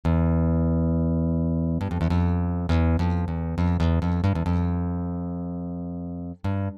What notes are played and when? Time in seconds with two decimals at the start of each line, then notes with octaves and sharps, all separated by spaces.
0.05 E2
1.81 G2
1.91 F2
2.01 E2
2.10 F2
2.69 E2
2.99 F2
3.28 E2
3.58 F2
3.80 E2
4.02 F2
4.24 G2
4.35 E2
4.46 F2
6.44 G2